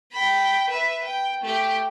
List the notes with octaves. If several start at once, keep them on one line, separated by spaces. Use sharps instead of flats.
G5 B5
B4 E5
G5
A3 G4